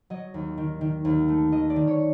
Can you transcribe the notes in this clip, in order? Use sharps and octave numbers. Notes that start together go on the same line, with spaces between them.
F#3 D#5
D#2
D#3
D#3
D#2
A3
D#3 D#5
D5
D#3
C#5